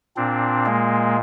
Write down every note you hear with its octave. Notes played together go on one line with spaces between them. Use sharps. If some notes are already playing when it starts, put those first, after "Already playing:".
A#2 C4 D4
G#3 A#3